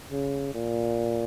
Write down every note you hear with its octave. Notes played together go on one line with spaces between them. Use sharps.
C#3
A#2